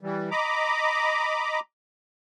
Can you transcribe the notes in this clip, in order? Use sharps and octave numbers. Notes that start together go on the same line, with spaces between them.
E3 G3
D#5 A#5 B5 D6